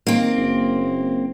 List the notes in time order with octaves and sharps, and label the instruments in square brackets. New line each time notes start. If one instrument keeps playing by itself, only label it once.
[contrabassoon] D#3 [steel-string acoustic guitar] A#3 C4
[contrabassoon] F#1